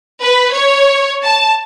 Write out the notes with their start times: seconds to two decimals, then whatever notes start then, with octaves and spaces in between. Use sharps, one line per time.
0.23 B4
0.54 C#5
1.24 A5